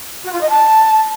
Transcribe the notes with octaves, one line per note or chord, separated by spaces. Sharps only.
F#4
F4
D#5
A5